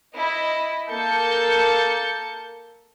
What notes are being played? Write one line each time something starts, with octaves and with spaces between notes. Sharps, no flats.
E4 D#5 B5
A#3 A4 A5 G6 C#7